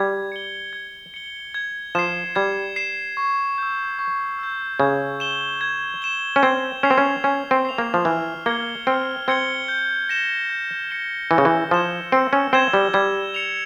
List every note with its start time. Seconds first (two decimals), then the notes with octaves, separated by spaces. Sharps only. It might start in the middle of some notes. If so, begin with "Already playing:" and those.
Already playing: G3 G#6
0.32 C#7 G7
0.73 G#6
1.14 C#7 G7
1.54 G#6
1.95 F3 C7 E7
2.36 G3 G#6
2.76 C7 E7
3.17 C#6
3.58 E6 G6
3.99 C#6
4.39 E6 G6
4.80 C#3 G#6
5.20 E7 G7
5.61 G#6
6.02 E7 G7
6.36 C#4
6.42 C4 G#6
6.83 C#4 C7 F7
6.90 C4
6.98 C#4
7.24 C#4 G#6
7.51 C4
7.65 C7 F7
7.78 A#3
7.94 F3
8.05 E3 F6
8.46 A#3 G#6 C#7 G7
8.87 C4 F6
9.28 C4 G#6 C#7 G7
9.68 G6
10.09 A#6 C#7 E7 G7
10.50 G6
10.90 A#6 C#7 E7 G7
11.31 E3 E6
11.38 C#3
11.45 E3
11.71 F3 G#6 E7 G7
12.12 C4 E6
12.33 C#4
12.53 C4 G#6 E7 G7
12.73 G3
12.94 G3 G#6
13.34 C#7 F7